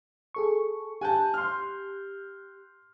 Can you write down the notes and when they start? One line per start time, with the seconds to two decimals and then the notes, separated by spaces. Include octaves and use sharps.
0.35 G#4 A4 C#6
1.01 G4 G#5 A5 F#6 G6
1.34 C6 F6